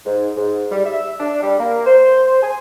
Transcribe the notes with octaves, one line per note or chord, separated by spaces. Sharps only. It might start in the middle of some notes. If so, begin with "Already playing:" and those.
G#2
G#2
G3
E5
D4
G3
A#3
C5
G#5